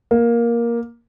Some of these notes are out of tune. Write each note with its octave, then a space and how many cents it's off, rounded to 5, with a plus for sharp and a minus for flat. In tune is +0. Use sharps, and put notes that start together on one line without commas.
A#3 +10